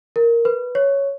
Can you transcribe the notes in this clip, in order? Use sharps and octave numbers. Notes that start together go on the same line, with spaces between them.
A#4
B4
C#5